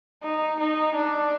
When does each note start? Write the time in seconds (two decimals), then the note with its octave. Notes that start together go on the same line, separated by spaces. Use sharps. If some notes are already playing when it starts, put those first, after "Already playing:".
0.24 D#4
0.60 D#4
0.95 D4